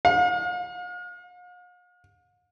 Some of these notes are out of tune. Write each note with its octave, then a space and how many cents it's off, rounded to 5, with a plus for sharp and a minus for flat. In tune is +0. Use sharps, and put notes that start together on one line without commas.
F5 +45